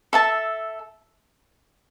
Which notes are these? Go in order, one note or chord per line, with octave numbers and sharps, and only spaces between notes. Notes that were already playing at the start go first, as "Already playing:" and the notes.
A4 E5 A5